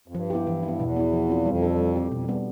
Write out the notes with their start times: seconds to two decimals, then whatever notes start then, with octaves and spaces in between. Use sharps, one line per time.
0.08 F2
0.14 G2 F3
0.30 B3 E4 G4
0.47 E3
0.63 E4
0.68 B3
0.80 E2 B2
0.96 B3 E4
1.13 F3
1.29 C4 F4
1.46 F2 G3
1.62 D4 A4
1.79 G3
1.96 C4 G4
2.11 F2 B2
2.25 E2 G3 B3 D4